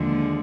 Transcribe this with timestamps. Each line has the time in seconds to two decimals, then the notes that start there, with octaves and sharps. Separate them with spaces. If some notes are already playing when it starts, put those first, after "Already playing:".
Already playing: D#2 D3 F3 G#3